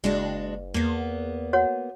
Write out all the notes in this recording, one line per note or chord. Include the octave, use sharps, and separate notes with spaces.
F#1 G#3 D4 F#4
E2 A#3 B3
F#4 C#5 F#5